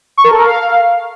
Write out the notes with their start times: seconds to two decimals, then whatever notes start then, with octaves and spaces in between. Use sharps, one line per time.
0.18 C#6
0.24 A#4
0.31 A4
0.38 A#4
0.45 F5